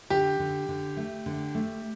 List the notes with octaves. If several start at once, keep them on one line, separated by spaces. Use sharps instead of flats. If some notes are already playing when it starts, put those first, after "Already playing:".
D3 G4
D3
D3
A3
D3
A3